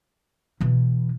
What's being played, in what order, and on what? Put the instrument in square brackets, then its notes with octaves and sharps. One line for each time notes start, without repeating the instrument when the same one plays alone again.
[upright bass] B2 E3